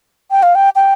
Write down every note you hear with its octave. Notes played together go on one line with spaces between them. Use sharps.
G5
F5
G5
G5